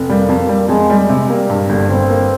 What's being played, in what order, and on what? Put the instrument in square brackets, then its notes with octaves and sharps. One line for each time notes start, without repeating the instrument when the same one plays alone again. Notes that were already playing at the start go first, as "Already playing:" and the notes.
Already playing: [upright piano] F1
[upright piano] G3 [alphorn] A#3
[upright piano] F2
G3
[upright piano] F2 [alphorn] G#3
[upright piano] G3
[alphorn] G#3
[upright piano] C3
[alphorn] G3 [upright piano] A#3
[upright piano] G2
G1
[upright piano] G1 [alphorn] C4
[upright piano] A#3